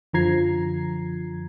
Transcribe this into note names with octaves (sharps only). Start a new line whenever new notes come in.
F#2 D3 F3 A#5 G#6 C7